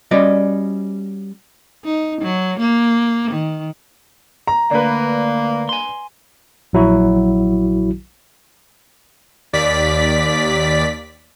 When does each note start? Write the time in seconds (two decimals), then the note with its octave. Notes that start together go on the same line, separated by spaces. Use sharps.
0.11 G3 C#4 F#4 D5 D#5
1.85 D#4
2.22 F#3
2.60 A#3
3.31 D#3
4.47 A#5
4.71 D2 A#3 D4 B4
5.69 G#5 C6
6.73 A#1 F#3 E4 F#4
9.53 D#2 D5 B6